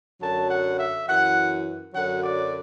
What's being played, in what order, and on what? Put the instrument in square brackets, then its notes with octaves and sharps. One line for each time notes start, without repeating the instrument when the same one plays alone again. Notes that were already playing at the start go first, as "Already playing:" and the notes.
[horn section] F#2 D3 F#3 A5
F#5
E5
F#2 E3 F#5
F#2 D3 F#3 F#5
D5